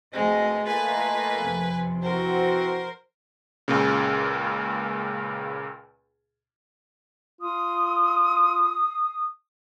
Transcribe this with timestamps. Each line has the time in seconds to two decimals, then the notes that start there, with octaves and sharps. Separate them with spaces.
0.13 D2 G#2 B2 G#3 C4 D#5
0.67 A3 A#3 F4 B4 D#5 G#5
1.40 F2 C3
2.02 E3 C4 F#4 A#4 C5
3.68 C#2 A#2 C#3
7.41 F4 D#6